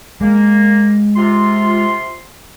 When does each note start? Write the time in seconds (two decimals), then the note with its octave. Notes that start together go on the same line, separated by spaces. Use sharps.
0.21 G#3 A#3
1.17 C3 F4 C6